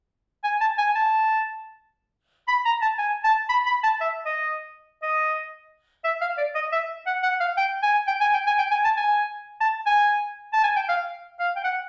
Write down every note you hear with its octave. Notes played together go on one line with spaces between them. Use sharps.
G#5
A5
G#5
A5
B5
A#5
A5
G#5
A5
B5
B5
A5
E5
D#5
D#5
E5
F5
D5
D#5
E5
F#5
F#5
F5
G5
G#5
G5
G#5
G5
G#5
G5
G#5
A5
G#5
A5
G#5
A5
G#5
G5
F5
F5
G5
F#5